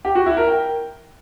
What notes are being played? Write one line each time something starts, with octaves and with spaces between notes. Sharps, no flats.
G4
F#4
E4
A#4
G5